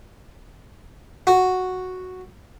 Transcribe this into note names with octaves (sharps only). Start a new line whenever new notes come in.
F#4